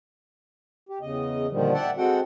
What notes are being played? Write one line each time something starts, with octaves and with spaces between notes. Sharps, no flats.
G4
E2 C#3 D#5
A#2 D3 D#3 F3 G3
D5 E5 F#5 G5 A5
G#3 C4 F#4 A4 F#5 G5